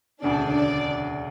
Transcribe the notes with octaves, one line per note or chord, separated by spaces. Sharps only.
E1 D2 C#3 D4 D5
D4 D5